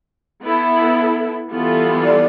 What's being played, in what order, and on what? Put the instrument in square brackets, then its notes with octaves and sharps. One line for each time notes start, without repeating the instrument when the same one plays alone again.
[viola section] B3 E4 A4
E3 G3 B3 F4 A4
[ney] D5